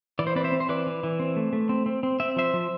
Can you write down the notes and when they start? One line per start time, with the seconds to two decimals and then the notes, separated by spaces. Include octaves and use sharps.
0.19 E3 D5
0.27 C5
0.36 C4 B4 D5
0.44 C5 E5
0.52 C4
0.60 C5
0.69 E3 B4 D5
0.87 E3
1.03 E3
1.20 C4
1.36 A3
1.53 A3
1.69 C4
1.86 C4
2.03 C4
2.20 C4 E5
2.36 F3 C5 E5
2.54 F3